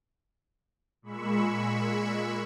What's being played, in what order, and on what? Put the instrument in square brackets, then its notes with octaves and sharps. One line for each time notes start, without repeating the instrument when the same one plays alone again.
[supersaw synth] A#2 G#3 B5 C#6 E6